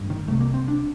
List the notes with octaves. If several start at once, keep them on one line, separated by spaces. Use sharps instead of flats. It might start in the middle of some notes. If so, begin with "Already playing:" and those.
Already playing: A1 G2
D#3
C2 C3 A3
A#3
C4
D4